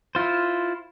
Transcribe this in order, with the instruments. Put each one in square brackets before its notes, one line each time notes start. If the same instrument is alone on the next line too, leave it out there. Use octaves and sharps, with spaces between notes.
[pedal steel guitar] E4 F4 C5